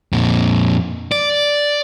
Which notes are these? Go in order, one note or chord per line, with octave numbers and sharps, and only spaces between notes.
F2 A#2
D5